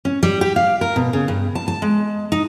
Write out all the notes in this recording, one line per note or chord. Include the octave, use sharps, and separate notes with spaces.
C#4
G3
G4
F5
A#4
B2
C#3
G2
A5
A5
G#3
D#4